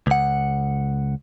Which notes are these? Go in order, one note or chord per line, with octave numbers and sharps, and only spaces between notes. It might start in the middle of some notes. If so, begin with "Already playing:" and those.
C#2 F#5